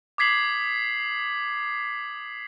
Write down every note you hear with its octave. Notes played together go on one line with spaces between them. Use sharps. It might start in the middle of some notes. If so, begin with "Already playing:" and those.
D6 D#6 G#6 B6 C7 F#7